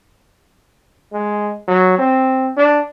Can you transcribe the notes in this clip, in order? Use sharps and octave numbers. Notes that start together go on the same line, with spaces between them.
G#3
F#3
C4
D4